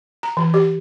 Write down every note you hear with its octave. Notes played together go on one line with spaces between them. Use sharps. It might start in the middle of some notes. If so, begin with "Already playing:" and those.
A#5
E3
G4